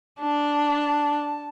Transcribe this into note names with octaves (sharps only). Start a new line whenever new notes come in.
D4 A5